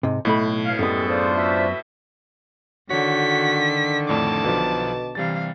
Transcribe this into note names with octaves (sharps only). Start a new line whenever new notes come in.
G#2 C3
B1 A2 A3 B5
B2 C#5 F5
F#2 G3 G#3 B3 G#4 A4
D4 F4 C5
F#4 B4 E5
D3 D#3 F#4 C#5 B6
F2 A2 A3 D4 A5 D6
B1 B2 F3
C3 E3 G3 F5 A6